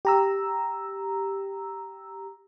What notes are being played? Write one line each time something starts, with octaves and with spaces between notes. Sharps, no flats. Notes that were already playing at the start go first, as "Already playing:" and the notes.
G4 A#5 E6